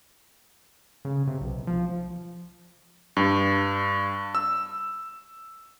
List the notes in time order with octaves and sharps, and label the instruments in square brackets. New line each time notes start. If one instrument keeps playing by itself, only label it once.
[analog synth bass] C#3
C3
B1
F3
[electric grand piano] G2
E6